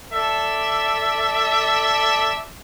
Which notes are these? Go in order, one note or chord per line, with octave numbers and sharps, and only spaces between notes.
A4 D5 E5